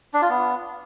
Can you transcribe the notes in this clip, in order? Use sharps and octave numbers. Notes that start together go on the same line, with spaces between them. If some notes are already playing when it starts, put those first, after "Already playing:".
D4
F4
B3